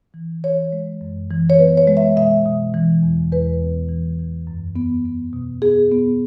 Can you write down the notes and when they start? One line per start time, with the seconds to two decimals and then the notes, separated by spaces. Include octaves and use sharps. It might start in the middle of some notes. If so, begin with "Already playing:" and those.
0.14 E3
0.43 E3 C#5
0.73 G#3
1.01 F#2
1.30 E3
1.50 C#5
1.58 B3 B4
1.77 C#5
1.88 G#3
1.97 E5
2.16 B2 E5
2.46 B2
2.74 E3
3.03 E2
3.32 E2 B4
3.61 B3
3.89 E3
4.19 E3
4.47 F#2
4.76 B3
5.05 B3
5.33 B2
5.62 B3 G#4
5.92 B3